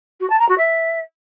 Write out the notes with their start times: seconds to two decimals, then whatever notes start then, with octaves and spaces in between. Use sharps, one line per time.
0.20 F#4
0.30 A5
0.39 A#5
0.48 F#4
0.58 E5